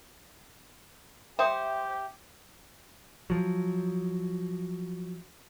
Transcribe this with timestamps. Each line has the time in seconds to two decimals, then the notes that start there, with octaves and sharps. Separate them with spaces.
1.39 G4 C5 E5 G5 D#6
3.30 F3 F#3